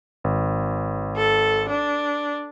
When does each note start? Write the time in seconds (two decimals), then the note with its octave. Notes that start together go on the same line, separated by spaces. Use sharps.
0.24 G#1
1.17 A4
1.69 D4